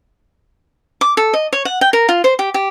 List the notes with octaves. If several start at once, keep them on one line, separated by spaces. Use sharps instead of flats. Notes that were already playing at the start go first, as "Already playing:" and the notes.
D6
A4
D#5
C#5
F#5
G5
A#4
F4
C5
G4
G4